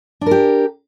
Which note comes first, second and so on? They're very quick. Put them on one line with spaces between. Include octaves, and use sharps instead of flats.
D4 A#4 G4